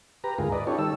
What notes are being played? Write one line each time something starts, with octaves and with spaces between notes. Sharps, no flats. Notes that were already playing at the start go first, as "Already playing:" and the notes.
G4 B4 A#5
D2 G#2 F4 G#4 A#4
B4 D5 D#5
C#4 D#4 F4 G4 A4 C#5
D#3 G3 A4 E6